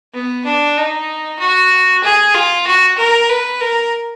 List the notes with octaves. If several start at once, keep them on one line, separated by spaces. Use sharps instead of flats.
B3
D4
D#4
F#4
G#4
F4
F#4
A#4
B4
A#4